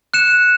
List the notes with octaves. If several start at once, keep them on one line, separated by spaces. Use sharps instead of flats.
F#6 C#7 E7